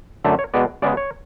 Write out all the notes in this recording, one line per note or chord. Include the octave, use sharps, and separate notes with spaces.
F#2 D3 A3 E5
C#5
B2 G#3 B3 D5
C#3 G#3 B3 D5
C#5